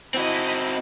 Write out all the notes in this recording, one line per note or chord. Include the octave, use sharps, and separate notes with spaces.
C4 E4 F#4 D#5